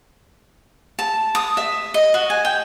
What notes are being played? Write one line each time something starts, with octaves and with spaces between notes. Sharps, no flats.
A5
D#6
E5
D#5
F#4
G#5
G5